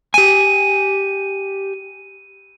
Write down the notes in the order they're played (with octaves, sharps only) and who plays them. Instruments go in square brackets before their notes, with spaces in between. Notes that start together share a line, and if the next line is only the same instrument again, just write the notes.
[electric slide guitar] G4 G#5 [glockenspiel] D#7